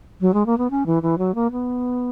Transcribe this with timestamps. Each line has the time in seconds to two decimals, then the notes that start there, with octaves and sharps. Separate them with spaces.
0.21 F#3
0.34 G#3
0.46 A#3
0.58 B3
0.70 C#4
0.86 E3
1.02 E3
1.18 F#3
1.35 A#3
1.51 B3